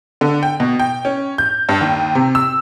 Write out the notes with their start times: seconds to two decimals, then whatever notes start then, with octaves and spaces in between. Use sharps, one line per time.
0.21 D3
0.43 G5
0.60 B2
0.79 G5
1.05 C#4
1.38 G6
1.69 G2
1.81 D#2
2.15 C3
2.35 E6